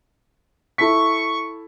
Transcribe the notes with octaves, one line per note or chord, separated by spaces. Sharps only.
E4 A4 C#6 B6